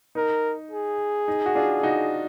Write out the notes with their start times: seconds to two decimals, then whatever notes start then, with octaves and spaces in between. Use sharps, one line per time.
0.15 D#4 A#4
0.71 G#4
1.28 D#4
1.46 F#4
1.55 D4 F4
1.83 D#4 F#4